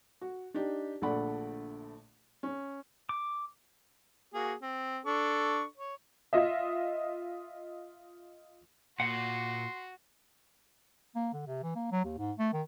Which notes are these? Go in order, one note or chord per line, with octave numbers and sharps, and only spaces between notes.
F#4
D4 D#4 G4
A#1 D3 A3 D5 F#5 B5
C#4
D6
A#3 F#4 G#4
C4
D4 A4 C#6
C#5
F4 D#5 E5
A#2 F#4 F#5 C6
A#3
D3
C3
E3
A#3
F#3
D#2
G#2
A3
D#3